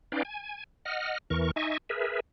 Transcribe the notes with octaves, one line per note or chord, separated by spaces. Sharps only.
C#4 D#4 B4 D5 F5 G5
G#5
D#5 F#5 F6
E2 E3 A#4 C#6
D#4 D#5 E5 G#5 C#6
G#4 A#4 B4 E5